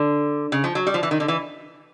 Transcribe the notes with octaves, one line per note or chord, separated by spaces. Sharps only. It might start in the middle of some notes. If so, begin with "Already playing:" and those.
Already playing: D3
C#3
F3
F#3
G3
F3
E3
D#3
D3
E3